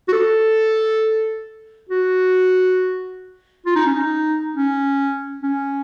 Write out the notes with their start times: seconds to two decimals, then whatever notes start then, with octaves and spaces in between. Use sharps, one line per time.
0.08 F#4
0.13 A4
1.89 F#4
3.66 F4
3.76 D#4
3.86 C#4
3.95 D#4
4.55 C#4
5.43 C#4